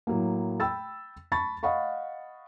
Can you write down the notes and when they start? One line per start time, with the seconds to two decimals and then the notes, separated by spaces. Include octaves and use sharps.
0.07 A2 F#3 A#3
0.60 G5 B5 E6 A6
1.32 A5 B5 C#6 A6
1.63 D#5 F5 F#5 B5 C#6